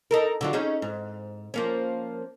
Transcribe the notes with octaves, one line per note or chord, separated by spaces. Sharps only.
D#4 A4 A#4
D3 F#3 F4
C#4 D#4 G#4
G#2
F3 A#3 C#4